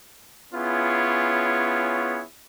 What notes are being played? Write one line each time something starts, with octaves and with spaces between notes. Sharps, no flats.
B3 C#4 E4 F4 G#4 C#5